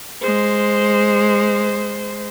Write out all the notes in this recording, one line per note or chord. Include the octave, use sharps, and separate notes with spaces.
G#3 C5